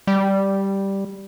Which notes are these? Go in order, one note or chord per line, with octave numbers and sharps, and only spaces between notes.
G3